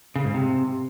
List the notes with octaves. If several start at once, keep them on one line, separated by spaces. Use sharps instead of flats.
C#3
G#2
C3